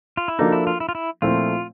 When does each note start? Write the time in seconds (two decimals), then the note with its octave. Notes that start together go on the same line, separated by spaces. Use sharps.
0.17 F4
0.28 E4
0.39 F3 A#3 D4 D#4 F#4 A4
0.52 E4
0.67 F4
0.80 E4
0.89 F4
0.95 E4
1.22 A#2 F3 A3 C4 E4 F4